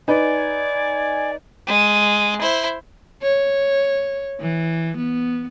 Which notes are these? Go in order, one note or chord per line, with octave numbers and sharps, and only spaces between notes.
D#4 B4 D5 G#5
G#3
E4 C5
C#5
E3
B3